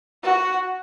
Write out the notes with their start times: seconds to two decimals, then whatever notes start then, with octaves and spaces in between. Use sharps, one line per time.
0.23 F#4